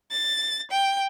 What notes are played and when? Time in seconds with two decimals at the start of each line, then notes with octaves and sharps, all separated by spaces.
0.10 A6
0.72 G5